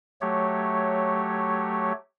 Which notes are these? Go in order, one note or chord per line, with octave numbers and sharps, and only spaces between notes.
F#3 A3 G4 C#5